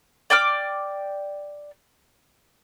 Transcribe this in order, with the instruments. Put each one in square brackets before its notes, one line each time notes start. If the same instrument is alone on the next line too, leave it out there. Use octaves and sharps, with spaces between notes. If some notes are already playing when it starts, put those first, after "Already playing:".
[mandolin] D5 G5 D6 F6